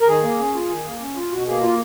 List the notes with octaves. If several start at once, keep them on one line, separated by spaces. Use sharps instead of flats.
A#4
D#3 G#4
A#3
C#4
F4
D#3
A#3
C#4
F4
B2 F#4
A#3 G#4
F4